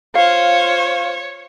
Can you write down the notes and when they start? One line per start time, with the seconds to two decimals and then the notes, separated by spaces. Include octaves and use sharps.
0.15 F4 C5 C#5 F5